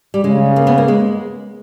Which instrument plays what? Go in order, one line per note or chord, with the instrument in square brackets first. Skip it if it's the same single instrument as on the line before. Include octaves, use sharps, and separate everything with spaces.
[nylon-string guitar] G3
[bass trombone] C#3 [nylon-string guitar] G#3
[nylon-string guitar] A#3
B3
A#3
G#3